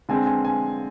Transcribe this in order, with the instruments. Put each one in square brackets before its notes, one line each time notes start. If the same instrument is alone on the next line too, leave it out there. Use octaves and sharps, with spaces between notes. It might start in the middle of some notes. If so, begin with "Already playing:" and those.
[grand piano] D3 G#3 C4 G#5
G#5
G#5